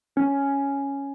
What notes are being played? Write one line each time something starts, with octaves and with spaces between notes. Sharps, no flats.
C#4